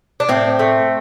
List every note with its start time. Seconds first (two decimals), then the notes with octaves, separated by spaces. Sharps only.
0.20 D4
0.29 A2 C4
0.59 A3